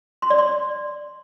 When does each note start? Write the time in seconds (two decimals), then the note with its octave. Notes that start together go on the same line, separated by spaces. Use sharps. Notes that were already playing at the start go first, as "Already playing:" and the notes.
0.22 C6
0.30 D5
0.38 C6